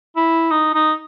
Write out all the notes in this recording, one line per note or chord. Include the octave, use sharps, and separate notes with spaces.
E4
D#4
D#4